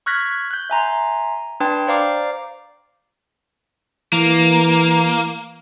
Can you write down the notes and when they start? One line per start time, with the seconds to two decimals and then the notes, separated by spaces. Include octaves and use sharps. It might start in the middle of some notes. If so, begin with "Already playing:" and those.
0.06 C#6 F6 F#6 G#6 A#6 B6
0.51 F#6 G6
0.70 E5 G#5 A#5 C6
1.60 D4 B4 G5 A5 C6
1.88 C5 D5 F5 A#5 D6
4.13 E3 A#3